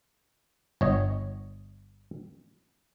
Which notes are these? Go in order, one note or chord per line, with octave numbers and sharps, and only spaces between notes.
G1 C#5 D#5